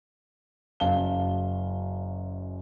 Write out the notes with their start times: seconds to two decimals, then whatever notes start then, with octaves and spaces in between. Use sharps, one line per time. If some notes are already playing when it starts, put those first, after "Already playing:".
0.80 F#1 F#2 F5 A5 G7